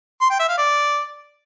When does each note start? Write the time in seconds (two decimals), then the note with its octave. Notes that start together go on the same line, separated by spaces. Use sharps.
0.21 C6
0.30 G5
0.39 E5
0.48 F5
0.58 D5